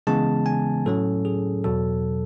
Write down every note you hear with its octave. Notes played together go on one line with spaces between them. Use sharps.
C#3 E3 G#3 B3 A5
G#5
A2 F#3 C#4 A4
G#4
E2 B2 F#3 A4